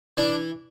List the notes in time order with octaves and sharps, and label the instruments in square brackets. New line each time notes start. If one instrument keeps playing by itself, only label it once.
[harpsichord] E3 D4